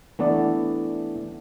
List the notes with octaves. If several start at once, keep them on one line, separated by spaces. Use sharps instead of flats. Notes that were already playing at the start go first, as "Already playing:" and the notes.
E3 A3 B3 D4 D5